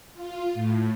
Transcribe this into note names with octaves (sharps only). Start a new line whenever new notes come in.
F4
A2